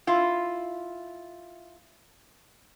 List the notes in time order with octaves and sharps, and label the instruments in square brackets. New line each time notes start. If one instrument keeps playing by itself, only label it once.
[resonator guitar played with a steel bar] E4 F4